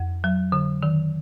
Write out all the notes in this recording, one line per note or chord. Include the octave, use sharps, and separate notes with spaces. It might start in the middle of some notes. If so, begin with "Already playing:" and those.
Already playing: F2
F#3
D3
D#3